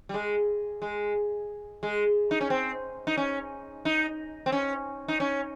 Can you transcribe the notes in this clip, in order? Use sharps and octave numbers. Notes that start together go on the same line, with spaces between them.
G3
G#3
G#3
G#3
D#4
C#4
C4
D#4
C#4
D#4
C4
C#4
D#4
C#4